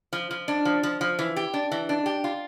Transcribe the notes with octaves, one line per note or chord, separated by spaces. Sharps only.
F3
F3
D4
F3
F3
F3
E3
G4
D4
E3
D4
G4
F4